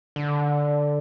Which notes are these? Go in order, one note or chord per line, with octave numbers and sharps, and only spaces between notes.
D3